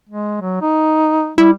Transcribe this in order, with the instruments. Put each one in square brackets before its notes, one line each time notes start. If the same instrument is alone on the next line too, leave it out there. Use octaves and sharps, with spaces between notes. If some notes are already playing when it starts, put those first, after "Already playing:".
[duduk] G#3
F#3
D#4
[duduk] G3 [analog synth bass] E4